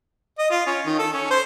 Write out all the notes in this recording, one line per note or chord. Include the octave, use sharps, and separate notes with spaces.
D#5
F4
C#4
D#3
A4
C#4
C5